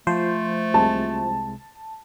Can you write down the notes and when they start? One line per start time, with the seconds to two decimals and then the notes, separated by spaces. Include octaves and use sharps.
0.07 F3 A3 C5
0.74 C2 C3 G#3 A5